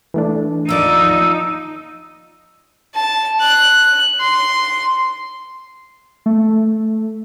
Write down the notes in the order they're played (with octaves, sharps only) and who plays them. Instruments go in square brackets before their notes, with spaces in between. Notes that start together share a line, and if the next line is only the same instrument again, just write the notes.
[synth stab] E3 A3 D4
[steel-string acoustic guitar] D#2 F3 D5 [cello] D#4 [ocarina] E6
[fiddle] A5
F#6
C6
[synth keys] A3